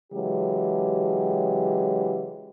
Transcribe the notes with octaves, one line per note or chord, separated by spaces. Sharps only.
C#3 E3 F#3 G#3 G4